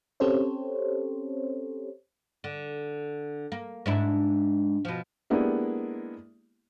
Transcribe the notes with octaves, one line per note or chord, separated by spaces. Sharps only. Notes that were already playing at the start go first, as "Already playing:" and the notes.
C4 C#4 G4 A4 C5 C#5
D3
A#3
G#2 D4 E4
B2 F3
G#3 A#3 B3 D4 E4 G4